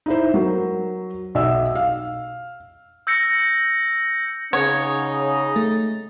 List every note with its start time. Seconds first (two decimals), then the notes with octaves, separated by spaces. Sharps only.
0.06 D#4 E4 C5
0.34 F#3 A#4
1.35 B1 D#5 E5 E6
1.75 F5
3.07 E6 G6 A#6 C#7
4.53 C#3 C#4 D#4 C#5 F#5
5.56 A3